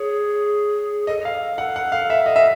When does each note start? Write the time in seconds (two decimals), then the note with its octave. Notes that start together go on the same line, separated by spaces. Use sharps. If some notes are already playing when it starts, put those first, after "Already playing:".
Already playing: G#4 C#5
1.07 A4 D#5
1.25 F5
1.58 F#5
1.76 F#5
1.92 F5
2.10 E5
2.26 D#5
2.36 E5